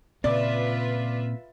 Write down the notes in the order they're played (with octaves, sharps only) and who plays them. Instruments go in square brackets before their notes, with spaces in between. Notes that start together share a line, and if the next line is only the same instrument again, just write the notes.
[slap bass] A#2 C#3 C4 [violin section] F4 B4 E5 [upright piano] D5